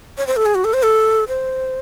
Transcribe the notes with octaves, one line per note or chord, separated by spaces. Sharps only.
C#5
C5
A4
G#4
F#4
A4
C5
A4
C5